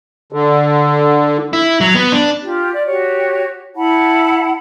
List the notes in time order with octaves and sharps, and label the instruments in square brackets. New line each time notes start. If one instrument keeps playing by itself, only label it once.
[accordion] D3
[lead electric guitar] E4
F#3
B3
D4
[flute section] F4 G4
D5
F#4 G4 C#5
E4 F#5 A5 B5